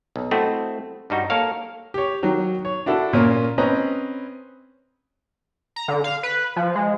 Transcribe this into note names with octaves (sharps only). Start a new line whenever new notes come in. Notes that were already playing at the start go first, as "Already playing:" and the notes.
B1
A3 C4 E4 F#4 D#5
G2 G3 D#4 F#4
A#3 A4 A#4 C#5 F5
G4 C#5
D#3 F#3
C#5
D4 E4 F#4 A4
A#2 A#3 C#4 A#4
C4 C#4 B4 D#5 A#5
A#5
D3
F5
B4
F3
G#3